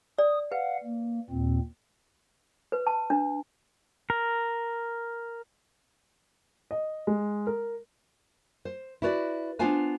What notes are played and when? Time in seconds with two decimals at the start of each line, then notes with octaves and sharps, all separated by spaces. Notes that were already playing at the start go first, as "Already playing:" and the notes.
0.18 D5 D#6
0.52 B4 F5 F#5
0.83 A#3
1.30 D#2 A#2 C4
2.72 B4
2.87 A5
3.10 D4
4.10 A#4
6.71 D#5
7.07 G#3
7.47 A#4
8.65 C5
9.02 E4 F#4 B4 C#5 D5
9.59 B3 D4 F4 C5 F5 G#5